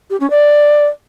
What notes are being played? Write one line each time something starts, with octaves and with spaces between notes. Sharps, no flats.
G4
C#4
D5